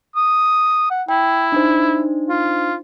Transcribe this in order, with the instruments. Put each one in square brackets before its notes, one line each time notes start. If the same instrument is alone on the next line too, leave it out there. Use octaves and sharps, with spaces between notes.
[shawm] D#6
F#5
[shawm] E4 [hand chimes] G5
[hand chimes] D4 D#4 C5
[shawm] F4